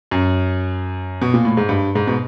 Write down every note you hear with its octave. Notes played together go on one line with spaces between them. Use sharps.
F#2
B2
A#2
A2
G#2
G2
G#2
B2